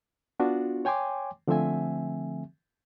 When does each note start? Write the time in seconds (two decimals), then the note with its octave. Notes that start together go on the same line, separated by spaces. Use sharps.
0.40 B3 D4 F4 F#4
0.85 C#5 G5 G#5 C6 D6
1.47 D3 F3 A3 C4 E5 G#5